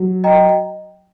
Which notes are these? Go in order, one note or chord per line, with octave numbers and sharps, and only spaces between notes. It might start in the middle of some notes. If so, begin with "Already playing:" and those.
Already playing: F#3
D#5 G5 A#5